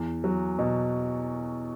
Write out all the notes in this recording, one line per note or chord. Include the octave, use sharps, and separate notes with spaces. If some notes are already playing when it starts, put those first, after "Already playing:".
Already playing: E2
F#3
B2